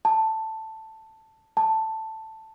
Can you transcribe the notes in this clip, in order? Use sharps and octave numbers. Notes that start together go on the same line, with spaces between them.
A5
A5